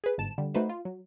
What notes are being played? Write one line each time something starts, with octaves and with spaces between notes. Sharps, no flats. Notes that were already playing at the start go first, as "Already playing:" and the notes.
G#4 B4
G1 G#2 A5 E7
D3 G3
A3 D#4 F#4 B4 C5
F4
F#3